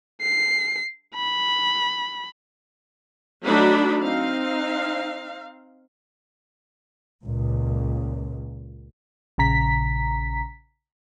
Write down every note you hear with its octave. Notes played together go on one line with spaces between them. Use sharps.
C7
B5
F#3 A3 D4 D#4 F#4 B5
C4 D#4 F5
C#2 A#2
A#1 C#3 A#5 B6